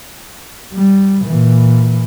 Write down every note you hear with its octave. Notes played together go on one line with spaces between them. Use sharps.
G3
A#2 E3